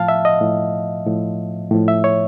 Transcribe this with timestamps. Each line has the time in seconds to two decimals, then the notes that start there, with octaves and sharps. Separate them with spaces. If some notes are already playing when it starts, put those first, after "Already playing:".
Already playing: A2 F3 F5 A5
0.08 E5
0.25 D#5
0.41 A2 F3
1.06 A2 F3
1.71 A2 F3
1.88 E5
2.04 C#5